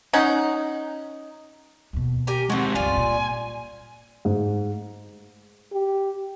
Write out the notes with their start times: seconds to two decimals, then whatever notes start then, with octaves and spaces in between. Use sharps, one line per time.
0.13 C#4 D#4 F#5
1.93 D#2 B2
2.27 G4 A#4 G#5
2.50 G#3 C4 F#4 A4
2.75 C#2 G2 F4 D5 G#5
2.97 A#2
4.25 G#2
5.72 G4